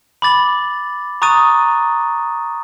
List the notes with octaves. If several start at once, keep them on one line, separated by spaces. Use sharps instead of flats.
B5 D6 A6 F#7
A#5 C#6 D#6 F#6 A6 D#7